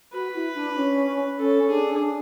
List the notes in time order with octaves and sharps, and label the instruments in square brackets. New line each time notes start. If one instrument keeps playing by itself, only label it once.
[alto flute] F#4 [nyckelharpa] B4
[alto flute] E4
D4
C#4
[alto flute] C#4 [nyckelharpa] A4
[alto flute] D4 [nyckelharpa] G#4
[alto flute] D4